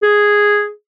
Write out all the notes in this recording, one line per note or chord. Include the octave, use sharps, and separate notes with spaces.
G#4